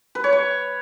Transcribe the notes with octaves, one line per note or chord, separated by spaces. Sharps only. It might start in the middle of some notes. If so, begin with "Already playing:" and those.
B4
C#5
C#6